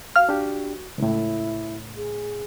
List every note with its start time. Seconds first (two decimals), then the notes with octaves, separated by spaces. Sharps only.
0.16 F#4 F5 F6
0.29 D4 G4
0.98 C#2 A2 E4
1.95 G#4